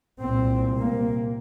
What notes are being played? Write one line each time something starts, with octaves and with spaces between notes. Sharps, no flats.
C2 A#2 C4
A#3